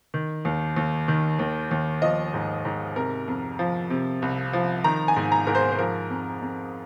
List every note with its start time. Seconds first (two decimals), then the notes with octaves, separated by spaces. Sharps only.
0.14 D#3
0.45 D#2
0.76 D#2
1.08 D#3
1.39 D#2
1.71 D#2
2.02 F3 D#5
2.34 G#2
2.65 G#2
2.96 C3 A#4
3.28 F2
3.59 F3
3.90 C3
4.22 C2
4.53 F3
4.84 D#3 A#5
5.08 G#5
5.16 G#2
5.32 A#5
5.47 G#2 A#4
5.55 C5
5.72 C5
5.79 F3 A#4
6.10 F2
6.42 F2